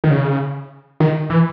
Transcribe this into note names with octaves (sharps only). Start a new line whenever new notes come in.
D#3
C#3
D#3
E3